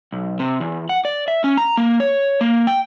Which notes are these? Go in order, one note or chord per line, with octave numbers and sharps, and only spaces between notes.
B1
C3
E2
F#5
D5
E5
C#4
A#5
A#3
C#5
A#3
G5